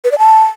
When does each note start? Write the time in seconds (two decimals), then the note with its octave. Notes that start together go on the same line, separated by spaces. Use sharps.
0.04 B4
0.11 D5
0.19 A5